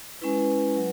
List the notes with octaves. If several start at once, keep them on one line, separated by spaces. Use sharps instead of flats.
G#3 C#4 E4 B4
F#3